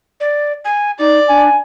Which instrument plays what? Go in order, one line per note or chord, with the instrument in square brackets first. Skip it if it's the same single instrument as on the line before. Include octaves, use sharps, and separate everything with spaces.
[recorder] D5
G#5
[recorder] D#4 [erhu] D5
[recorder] D4 [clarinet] G#5